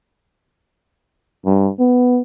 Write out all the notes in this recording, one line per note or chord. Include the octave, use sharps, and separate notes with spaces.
G2
B3